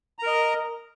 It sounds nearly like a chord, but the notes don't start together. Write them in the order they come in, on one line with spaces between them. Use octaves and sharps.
A#5 A#4 D#5